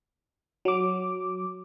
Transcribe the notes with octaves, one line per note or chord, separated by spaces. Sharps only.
F#3 D6